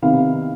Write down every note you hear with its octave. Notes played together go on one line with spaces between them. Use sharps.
C3 D#3 B3 F5